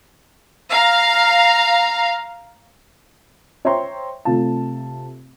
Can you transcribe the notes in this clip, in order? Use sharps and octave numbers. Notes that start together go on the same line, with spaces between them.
F5 A#5
C5 C#5 E5 G5 A#5 C6
C3 A3 F4 A5